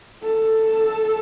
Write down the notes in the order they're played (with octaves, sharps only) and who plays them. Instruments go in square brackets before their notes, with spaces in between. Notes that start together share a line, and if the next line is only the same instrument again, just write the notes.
[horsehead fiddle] A4